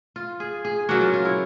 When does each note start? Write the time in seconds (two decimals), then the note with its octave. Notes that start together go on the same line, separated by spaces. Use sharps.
0.16 F4
0.40 G#4
0.65 G#4
0.89 C#3 F#3 A#3 F#4
1.01 F4
1.13 F4
1.25 E4